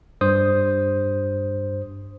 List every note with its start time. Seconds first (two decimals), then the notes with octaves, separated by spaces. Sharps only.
0.21 G2 C5 D#6